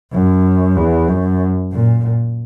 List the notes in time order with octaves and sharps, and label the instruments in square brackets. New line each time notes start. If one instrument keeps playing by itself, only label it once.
[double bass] F#2
E2
F#2
A#2